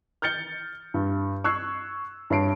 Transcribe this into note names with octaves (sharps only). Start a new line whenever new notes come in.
F6 G6 A6 C#7 G7
G2
C#6 E6 F#6 G#6 C7
G2 C#5 A5 C7 D7